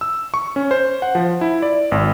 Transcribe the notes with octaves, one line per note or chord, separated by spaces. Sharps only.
E6
C#6
C#4
C5
F#5
F3
E4
D5
G#1